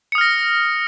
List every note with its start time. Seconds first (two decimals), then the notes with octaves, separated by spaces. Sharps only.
0.12 C#7
0.15 D#6
0.18 F6
0.21 A#6